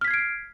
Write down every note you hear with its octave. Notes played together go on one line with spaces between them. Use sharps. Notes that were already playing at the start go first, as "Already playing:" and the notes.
F6 G#6 B6 C7 D7